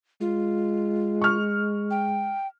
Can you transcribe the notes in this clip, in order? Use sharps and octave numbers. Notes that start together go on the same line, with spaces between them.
G#3 F4
C#6 F6
G5